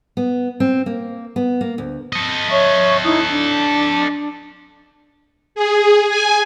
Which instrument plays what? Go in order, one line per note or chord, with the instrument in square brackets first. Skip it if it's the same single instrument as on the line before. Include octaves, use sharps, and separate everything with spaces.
[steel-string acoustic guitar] B3
C4
A#3
B3
A#3
D2
[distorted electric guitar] A4 D#5
[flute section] C#5 E5 C#6
D#4 E4 D#6
D4
[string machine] G#4
G#5